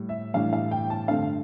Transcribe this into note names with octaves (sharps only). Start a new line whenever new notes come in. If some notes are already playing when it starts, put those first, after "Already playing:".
Already playing: A2 G3
E5
A2 E3 G3 D4 F5
F5
G5
A5
G2 D3 A3 C4 F5